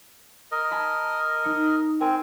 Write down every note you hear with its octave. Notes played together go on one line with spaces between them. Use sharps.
A#4 D#5
G#5 A5 B5
D#4 C#7
C4 A#4 G#5